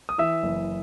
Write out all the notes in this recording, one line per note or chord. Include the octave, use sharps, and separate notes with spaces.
D#6
E3 E5 E6
F#1